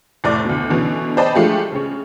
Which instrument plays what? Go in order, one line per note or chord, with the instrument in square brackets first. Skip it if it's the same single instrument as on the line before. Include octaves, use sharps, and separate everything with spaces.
[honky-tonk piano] F1 A2 D5 D6
D2 B2
B2 D3 E3 C#4
C5 D5 D#5 G5 A5 B5
F3 G#3 A3 D4 F4 G4
C#3 C#4